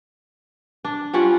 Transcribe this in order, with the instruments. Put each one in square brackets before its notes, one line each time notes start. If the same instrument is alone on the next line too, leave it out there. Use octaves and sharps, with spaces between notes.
[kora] D4
[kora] G3 C#4 F#5 [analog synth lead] F4